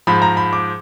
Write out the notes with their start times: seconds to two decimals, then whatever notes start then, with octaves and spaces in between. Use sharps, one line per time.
0.07 G#2 F3 B5
0.22 A#5
0.37 B5
0.53 D6